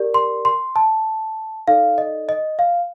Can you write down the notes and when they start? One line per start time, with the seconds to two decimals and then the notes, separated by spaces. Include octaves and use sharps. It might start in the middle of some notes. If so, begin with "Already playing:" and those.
Already playing: G4 A#4 D5
0.14 C6
0.45 C6
0.76 A5
1.68 D#4 A4 D5 F5
1.98 D#5
2.29 D#5
2.59 F5